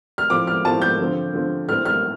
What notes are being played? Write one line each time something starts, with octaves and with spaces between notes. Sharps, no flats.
F6
A2 F3 C4 D6
F6
A2 F3 C4 A5
G6
D3 F3 C4
D3 F3 C4
A2 A3 C4 F6
F6